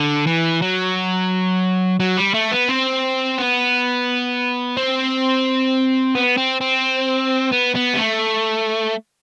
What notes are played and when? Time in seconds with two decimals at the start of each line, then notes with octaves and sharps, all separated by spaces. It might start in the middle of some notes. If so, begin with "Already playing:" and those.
Already playing: D3
0.27 E3
0.62 F#3
2.00 F#3
2.17 G3
2.34 A3
2.52 B3
2.69 C4
3.38 B3
4.77 C4
6.15 B3
6.37 C4
6.61 C4
7.53 B3
7.76 B3
7.95 G3
7.98 A3